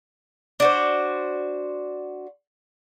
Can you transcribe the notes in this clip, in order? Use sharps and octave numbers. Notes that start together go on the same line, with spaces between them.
D4 F#4 C5